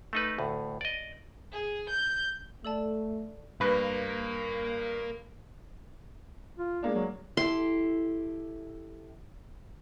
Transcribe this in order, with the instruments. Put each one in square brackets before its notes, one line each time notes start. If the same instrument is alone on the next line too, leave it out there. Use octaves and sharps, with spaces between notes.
[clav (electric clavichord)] A3 D#4 B4
D2 A2
D5 D#5
[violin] G#4
G6
[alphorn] A3 [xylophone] A4 D5 A5
[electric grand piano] G2 [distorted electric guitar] A#4 F5 [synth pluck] B4
[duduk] F4
[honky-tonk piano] G#3 A#3 D4
[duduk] F#3
[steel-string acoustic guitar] E4 G4 A4 [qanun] C6